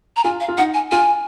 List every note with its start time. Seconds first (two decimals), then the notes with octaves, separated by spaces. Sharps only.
0.17 A#5
0.24 F4 G#5
0.40 F5
0.48 F4
0.58 D#4 F#5
0.74 G#5
0.92 F4 G#5